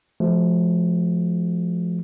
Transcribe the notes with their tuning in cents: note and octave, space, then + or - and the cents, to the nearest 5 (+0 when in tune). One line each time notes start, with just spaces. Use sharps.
F3 -5 A3 -40 F#4 +0